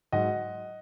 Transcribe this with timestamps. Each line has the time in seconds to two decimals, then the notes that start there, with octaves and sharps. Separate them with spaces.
0.12 G#2 F#3 D#5 F#5